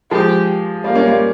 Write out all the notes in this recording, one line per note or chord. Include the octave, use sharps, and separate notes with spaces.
F3 G#3 G4
G3 A#3 F4
A#3 C#4
G3 A#3